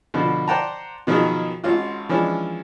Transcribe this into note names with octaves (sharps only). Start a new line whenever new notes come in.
B2 D3 F3
C5 D5 F#5 G5 A5 A#5
B2 D#3 F3 F#3 D#4 G#4
G#1 C#4 F4 F#4
E3 F3 G#3 C#4 D4